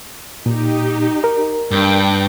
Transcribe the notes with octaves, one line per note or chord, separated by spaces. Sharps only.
A#2 D#4 G4
A#4
G2 D4 G5